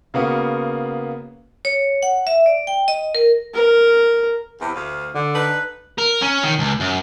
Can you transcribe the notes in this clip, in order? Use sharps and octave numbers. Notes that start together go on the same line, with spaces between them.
C#3 A#3 B3 F#4
C#5
F#5
E5
D5
G5
D#5
A#4
A#4
E2 C3
D2 F5
D3
D#4 A4 B4
A#4
C#4
D#3
C#2
F#2